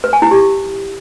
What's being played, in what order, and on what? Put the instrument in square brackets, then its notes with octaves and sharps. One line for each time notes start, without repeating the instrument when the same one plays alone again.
[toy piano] B4
G#5
E4
G4